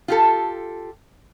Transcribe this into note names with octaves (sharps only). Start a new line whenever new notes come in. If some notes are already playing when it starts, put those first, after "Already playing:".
F4 G4 A4